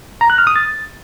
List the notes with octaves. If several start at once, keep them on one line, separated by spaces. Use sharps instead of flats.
A#5
F#6
F6
D#6
A6